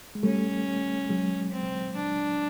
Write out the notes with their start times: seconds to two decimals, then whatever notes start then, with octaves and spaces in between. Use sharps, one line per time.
0.15 G#3
0.23 G3 A3 C#4
1.09 F#3 G#3
1.52 C4
1.96 D4